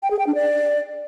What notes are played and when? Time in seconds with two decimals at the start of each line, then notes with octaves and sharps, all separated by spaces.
0.03 G5
0.11 G#4
0.19 G5
0.27 D4
0.35 D5